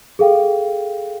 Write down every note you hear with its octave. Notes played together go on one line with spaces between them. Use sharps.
G#4 A4 F5 G5